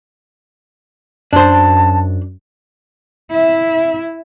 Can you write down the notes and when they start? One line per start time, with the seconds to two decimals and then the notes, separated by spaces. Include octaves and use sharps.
1.33 F#2 D4 C5 A5
3.31 E4 E5